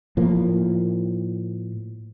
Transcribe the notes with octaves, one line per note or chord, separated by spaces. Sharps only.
A2 F3 A#3